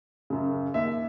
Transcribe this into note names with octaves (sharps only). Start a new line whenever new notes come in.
F#2 C#3
D#2 E5